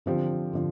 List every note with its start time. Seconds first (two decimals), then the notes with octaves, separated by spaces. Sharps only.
0.06 D3 F3 C4 G4
0.53 D3 F3